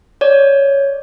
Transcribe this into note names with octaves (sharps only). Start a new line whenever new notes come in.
C#5 D5